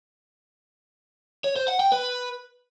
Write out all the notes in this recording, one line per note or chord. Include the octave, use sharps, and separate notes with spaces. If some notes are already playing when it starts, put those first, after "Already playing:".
C#5
C5
F#5
G5
B4